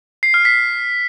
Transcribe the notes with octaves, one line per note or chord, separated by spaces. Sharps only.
C7
F6
B6